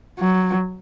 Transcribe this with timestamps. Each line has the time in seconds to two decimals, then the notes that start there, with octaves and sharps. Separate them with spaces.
0.19 F#3